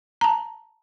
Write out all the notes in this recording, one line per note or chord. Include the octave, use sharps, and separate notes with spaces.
A5 A#5